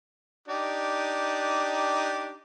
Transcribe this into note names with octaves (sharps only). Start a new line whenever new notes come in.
D4 D#4 G4